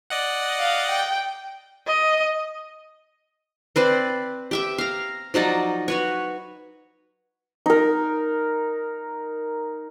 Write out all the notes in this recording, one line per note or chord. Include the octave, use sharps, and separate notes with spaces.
D5 D#5 F#5
F5
G5
D#5
C4 B4 C5 D5
G4 E5 G5
F5 A#5
F3 F#3 D#4 D5
F#4 B4 C#5
D#4 A#4